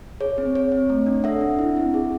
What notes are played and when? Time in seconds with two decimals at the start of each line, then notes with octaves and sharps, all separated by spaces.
0.20 G#4 C#5
0.38 C4
0.55 C4 C#5
0.72 C4
0.90 A3
1.06 D4
1.24 A4 E5 F#5
1.41 D4
1.59 E4
1.76 C4
1.94 G#4